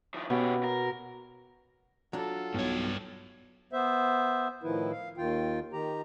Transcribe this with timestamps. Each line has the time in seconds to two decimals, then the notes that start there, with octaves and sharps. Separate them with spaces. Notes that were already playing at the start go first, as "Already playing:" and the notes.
0.14 D#3 F3
0.30 B2 C#4 G4
0.63 A#4
2.13 F#3 D4 F4 A4
2.54 B1 G2 C#5
3.73 B3 C5 E5
4.63 A2 D#3 F3 E4 B4
4.92 F5
5.17 D#2 D#3 F4 G5
5.73 D#3 G4 A#5